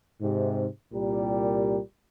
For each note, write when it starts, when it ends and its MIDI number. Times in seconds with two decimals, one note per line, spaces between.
0.21 0.66 44
0.21 0.66 48
0.93 1.78 36
0.93 1.78 46
0.93 1.78 55
0.93 1.78 67
0.93 1.78 70